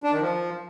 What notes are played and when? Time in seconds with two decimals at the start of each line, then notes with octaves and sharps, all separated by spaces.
0.03 D4
0.12 D#3
0.21 F3